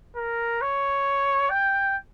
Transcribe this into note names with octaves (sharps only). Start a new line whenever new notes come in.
A#4
C#5
G5